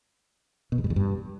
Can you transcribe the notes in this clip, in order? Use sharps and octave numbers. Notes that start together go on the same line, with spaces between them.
B2
E2
G2
E2
G2